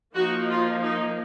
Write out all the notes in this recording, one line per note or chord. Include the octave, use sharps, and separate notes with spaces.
F3 A#3 D#4 F#4
F4
D#4